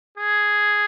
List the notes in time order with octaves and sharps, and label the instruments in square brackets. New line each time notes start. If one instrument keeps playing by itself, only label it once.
[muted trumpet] G#4